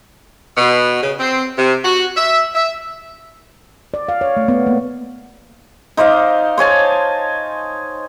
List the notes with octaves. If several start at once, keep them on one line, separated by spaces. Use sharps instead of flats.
B2
C#3
C4
C3
F#4
E5
E5
D5
F5
C#5
A3
B3
A#3
D#4 C5 D5 F5
C5 C#5 G#5 A5